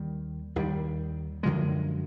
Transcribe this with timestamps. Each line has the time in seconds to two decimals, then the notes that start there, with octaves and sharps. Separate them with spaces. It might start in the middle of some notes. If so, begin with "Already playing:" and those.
Already playing: D#2 D#3 G3
0.56 D#2 D#3 G3
1.43 F#2 D3 F3 G#3